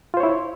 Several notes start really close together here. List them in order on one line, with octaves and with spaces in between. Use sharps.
F4 C5 C#5 E4